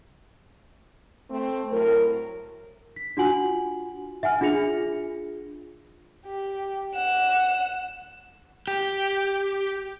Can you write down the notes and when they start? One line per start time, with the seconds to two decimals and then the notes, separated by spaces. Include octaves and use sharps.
1.30 A3 C4
1.72 A2 F#3 A#4
2.96 B6
3.17 D4 F4 F#4 F#5 G#5 F#7
4.23 E5 F#5 G#5 F6
4.41 D4 F4 G#4 A#6 C#7 F7
6.26 G4
6.94 F#5 E7
8.68 G4